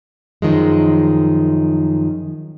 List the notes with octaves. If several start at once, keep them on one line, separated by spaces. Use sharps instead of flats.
F#2 D#3 F3 G#3